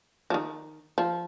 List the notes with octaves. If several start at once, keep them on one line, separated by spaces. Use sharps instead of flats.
F3
D#3
F3